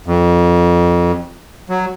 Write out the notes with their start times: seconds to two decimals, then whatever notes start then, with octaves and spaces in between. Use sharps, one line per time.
0.06 F2
1.69 F#3